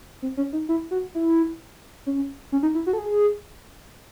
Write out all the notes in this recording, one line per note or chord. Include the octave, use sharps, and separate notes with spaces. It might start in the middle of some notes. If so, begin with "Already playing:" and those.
C4
C#4
D#4
E4
F#4
E4
C#4
C#4
D#4
E4
F#4
A4
G#4